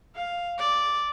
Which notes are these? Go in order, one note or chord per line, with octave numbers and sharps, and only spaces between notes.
F5
D5